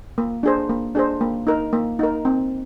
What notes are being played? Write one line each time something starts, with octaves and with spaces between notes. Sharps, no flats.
A#3
D4 G#4 C5
A#3
D4 G#4 C5
A#3
D#4 A#4
A#3
D#4 A#4
C4